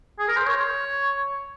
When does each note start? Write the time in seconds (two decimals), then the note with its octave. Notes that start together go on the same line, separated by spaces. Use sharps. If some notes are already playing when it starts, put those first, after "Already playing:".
0.19 G#4
0.28 A#4
0.37 C5
0.46 C#5